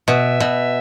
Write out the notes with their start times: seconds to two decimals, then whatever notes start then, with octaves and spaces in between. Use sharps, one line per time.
0.08 B2 E5
0.40 B2